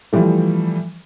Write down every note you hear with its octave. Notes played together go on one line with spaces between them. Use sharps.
E3 F3 G3 A3